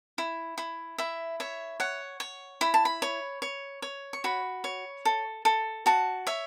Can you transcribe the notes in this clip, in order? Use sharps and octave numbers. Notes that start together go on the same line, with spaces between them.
E4
E4
E4 E5
C#5 E5
C#5 F#5
C#5
E4 B5
A5
B5
C#5
C#5
C#5
C#6
F#4 B5
C#5
A4
A4
F#4 A5
C#5 E5